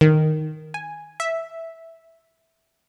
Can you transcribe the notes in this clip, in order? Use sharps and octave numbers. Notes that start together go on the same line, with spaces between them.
D#3
G#5
E5